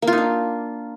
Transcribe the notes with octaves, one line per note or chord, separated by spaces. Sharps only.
A#3
F4
D#4
D4